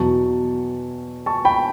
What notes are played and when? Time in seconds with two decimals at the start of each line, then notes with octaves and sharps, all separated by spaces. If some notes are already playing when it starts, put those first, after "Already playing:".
Already playing: E2 B2 F#3 A5 C#6
1.26 A5 C#6
1.45 G5 B5